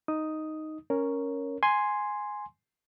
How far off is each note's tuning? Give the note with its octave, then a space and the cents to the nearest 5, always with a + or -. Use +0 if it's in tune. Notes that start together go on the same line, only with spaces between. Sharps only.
D#4 +0 D#6 +0
C#4 +0 A#4 +0 C#5 +0
G#5 +0 C6 +0